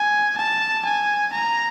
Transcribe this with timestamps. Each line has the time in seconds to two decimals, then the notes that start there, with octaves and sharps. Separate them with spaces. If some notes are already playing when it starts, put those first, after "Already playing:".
Already playing: G#5
0.37 A5
0.85 G#5
1.33 A#5